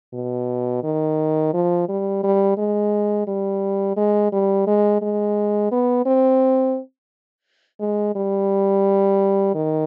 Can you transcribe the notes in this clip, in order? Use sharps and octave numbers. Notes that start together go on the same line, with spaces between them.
B2
D#3
F3
G3
G3
G#3
G3
G#3
G3
G#3
G#3
B3
C4
G#3
G3
D#3